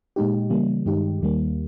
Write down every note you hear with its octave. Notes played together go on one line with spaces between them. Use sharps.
A#2 G#3 D#4 G4
C#3 E3 G3 A#3
G2 D#3 G#3 D#4 G4
D#2 D#3 G3 A#3